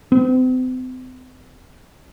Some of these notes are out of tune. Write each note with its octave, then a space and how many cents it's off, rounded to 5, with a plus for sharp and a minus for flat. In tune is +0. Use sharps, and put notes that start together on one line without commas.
C4 -40